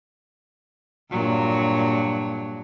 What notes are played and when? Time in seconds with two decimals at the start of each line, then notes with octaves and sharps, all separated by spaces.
1.12 G2 A#2 F#3